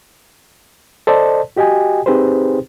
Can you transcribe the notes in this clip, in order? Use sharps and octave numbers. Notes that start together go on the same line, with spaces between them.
A4 C5 D5 D#5 A5
F#4 G4 D#5 G5 G#5
C4 D#4 G4 G#4 B4 C5